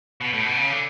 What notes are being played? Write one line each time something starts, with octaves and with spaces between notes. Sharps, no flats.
B2
A2
B2
C#3
D3